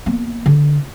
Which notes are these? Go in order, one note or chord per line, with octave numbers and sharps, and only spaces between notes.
A#3 B3
D3